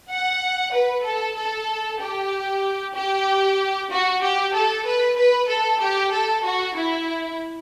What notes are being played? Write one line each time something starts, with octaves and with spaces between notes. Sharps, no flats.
F#5
B4
A4
A4
G4
G4
F#4
G4
A4
B4
B4
A4
G4
A4
F#4
E4